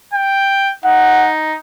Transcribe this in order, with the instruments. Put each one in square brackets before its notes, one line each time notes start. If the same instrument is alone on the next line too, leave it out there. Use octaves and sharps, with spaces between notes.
[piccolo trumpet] G5
[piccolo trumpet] D#4 [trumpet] F#5